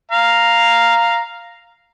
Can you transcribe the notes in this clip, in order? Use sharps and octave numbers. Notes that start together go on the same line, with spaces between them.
F5 A#5